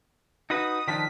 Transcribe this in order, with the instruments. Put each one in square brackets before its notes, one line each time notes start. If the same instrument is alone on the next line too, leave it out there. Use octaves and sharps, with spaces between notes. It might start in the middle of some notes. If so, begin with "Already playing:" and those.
[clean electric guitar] D#4 F#4 B4 [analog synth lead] D#6
[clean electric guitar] D#3 F3 D4 [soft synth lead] B6